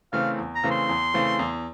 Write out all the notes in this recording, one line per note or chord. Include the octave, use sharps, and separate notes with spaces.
C#3 E3 A3 C4 F5
E2
A#5
C#3 E3 A3 C4
C6
E2
C#3 E3 A3 C4
E2